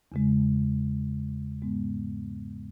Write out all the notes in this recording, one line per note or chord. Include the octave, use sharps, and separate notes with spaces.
E2 C#3 G#3
G#2 G#3 B3